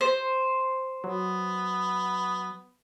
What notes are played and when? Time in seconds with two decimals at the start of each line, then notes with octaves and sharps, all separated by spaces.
0.01 C5
1.04 F#3 B3